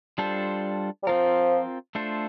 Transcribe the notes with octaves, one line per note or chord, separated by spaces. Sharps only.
G3 D4 F4 A4 C5
G3
F3 C4 F4 A#4
A3 D4 F4 A4 C5